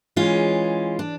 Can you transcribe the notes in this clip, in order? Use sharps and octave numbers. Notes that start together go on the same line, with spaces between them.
E3 G#3 C#4 F4
D4